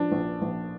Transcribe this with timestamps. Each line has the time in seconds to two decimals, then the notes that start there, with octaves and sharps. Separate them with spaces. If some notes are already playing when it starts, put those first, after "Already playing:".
Already playing: F3 D4
0.12 A#1
0.42 A#1